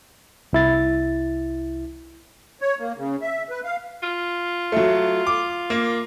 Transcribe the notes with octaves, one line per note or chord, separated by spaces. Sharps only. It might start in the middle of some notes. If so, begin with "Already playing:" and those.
C2 E4 A6
C#5
A#3
C#3
E5
B4
F5
F4
F#3 A3
D6
A#3